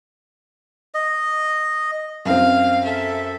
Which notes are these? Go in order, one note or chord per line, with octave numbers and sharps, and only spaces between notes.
D#5
F#2 C4 F5
A4 E5